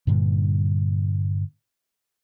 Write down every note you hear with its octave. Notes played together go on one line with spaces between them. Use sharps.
G2 A#2 D3 G3